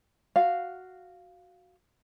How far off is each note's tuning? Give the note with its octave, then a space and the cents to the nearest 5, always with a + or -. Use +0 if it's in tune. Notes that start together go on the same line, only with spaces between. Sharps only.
F#4 +0 F5 +0